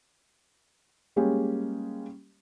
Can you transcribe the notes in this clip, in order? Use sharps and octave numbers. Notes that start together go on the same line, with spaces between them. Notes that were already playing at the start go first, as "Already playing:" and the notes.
G3 G#3 A#3 C#4 G4